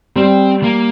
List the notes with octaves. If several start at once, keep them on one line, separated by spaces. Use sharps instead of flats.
G3 C4
A#3